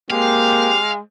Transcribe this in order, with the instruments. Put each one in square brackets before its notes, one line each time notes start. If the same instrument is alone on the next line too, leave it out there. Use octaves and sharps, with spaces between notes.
[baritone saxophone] G#3 [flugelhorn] A#3 [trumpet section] C4 G4 [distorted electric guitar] F5